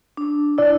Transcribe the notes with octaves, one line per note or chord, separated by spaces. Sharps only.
D4
E4 D5